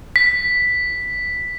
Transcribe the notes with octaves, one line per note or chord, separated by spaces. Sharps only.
B6